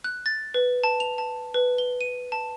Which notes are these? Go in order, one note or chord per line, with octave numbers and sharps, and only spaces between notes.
F#6
A6
B4
A5
F7
A5
B4
G7
D#7
A5